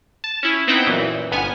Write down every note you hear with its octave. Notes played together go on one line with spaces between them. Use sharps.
A5
C#4 E4
B3 C4 D#4 E4 F#5 G5
F#2 A#2 E3
G1 B3 G#5 F6